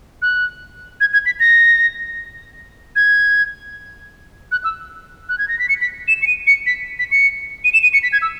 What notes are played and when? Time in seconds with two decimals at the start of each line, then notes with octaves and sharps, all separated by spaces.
0.22 F#6
1.01 G#6
1.13 G#6
1.26 B6
1.40 A#6
2.96 G#6
4.52 F#6
4.64 E6
5.29 F#6
5.38 G#6
5.48 A#6
5.59 B6
5.69 C#7
5.81 B6
6.08 E7
6.22 C#7
6.27 D#7
6.47 C#7
6.66 B6
6.99 B6
7.11 C#7
7.64 D#7
7.73 E7
7.83 D#7
7.93 C#7
8.03 B6
8.12 G#6
8.22 E6